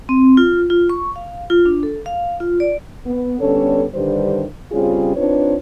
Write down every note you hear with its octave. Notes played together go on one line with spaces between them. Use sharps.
C4
F4
F4
C#6
F5
F4
D4
A4
F5
F4
D5
B3
D3 G3 B3 C#4 A4 C#5
G2 D3 D#3 G3 B4 C5
C#3 G3 C4 C#4 F4 G#4
C4 D4 D#4 F4 B4 C#5